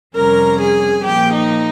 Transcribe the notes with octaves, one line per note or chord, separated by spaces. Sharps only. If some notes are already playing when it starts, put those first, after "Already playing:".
F2 C3 G3 C#4 A#4 A#5
G#4 G#5
A#2 F3 A#3 G4 G5
D#4 D#5